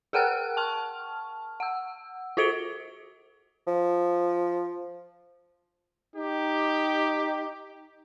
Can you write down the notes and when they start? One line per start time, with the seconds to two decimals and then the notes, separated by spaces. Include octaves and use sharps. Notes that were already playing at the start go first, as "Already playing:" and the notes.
0.13 G#4 A#4 F#5 G5 F6 F#6
0.57 A5 C#6 F6
1.60 F#5 E6
2.37 F4 F#4 C5 C#7 D7 G7
3.67 F3
6.16 D#4 G4